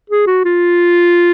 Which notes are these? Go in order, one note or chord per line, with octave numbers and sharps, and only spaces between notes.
G#4
F#4
F4